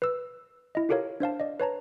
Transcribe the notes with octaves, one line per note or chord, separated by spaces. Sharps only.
B4 E6
E4 D#5
F4 G4 A4 A#4 C#5 F5
D4 C5 F5 A5
D5 D#5
B4 C#5 A5 A#5